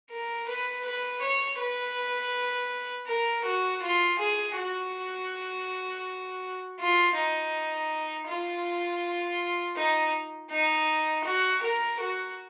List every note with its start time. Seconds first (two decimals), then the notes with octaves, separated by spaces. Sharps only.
0.11 A#4
0.48 B4
0.85 B4
1.21 C#5
1.59 B4
3.07 A#4
3.44 F#4
3.82 F4
4.19 G#4
4.56 F#4
6.79 F4
7.16 D#4
8.27 F4
9.76 D#4
10.51 D#4
11.24 F#4
11.62 A#4
12.00 F#4